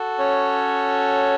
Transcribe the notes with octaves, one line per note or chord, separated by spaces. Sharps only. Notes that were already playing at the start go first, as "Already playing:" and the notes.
Already playing: F#4 A4
C#4 C#5